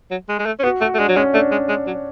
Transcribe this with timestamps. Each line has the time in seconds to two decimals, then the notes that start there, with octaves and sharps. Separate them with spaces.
0.11 F#3
0.29 G#3
0.39 G#3
0.46 A3
0.60 C#4
0.64 B3 F#4
0.81 A3 F#4
0.95 A3
0.99 G#3 D4
1.09 F#3
1.17 G#3 C#4
1.34 A3 D4
1.52 G#3
1.69 G#3
1.87 F#3